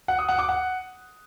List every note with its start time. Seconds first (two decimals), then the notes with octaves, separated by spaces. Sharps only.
0.08 F#5
0.18 D#6
0.29 F#5
0.39 D6
0.49 F#5